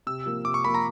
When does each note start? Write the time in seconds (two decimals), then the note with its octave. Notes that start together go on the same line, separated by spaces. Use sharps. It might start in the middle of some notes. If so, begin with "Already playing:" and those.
0.07 C3 E6
0.26 F3 A#3
0.45 C3 D6
0.54 C#6
0.65 F3 A#3 B5
0.74 A#5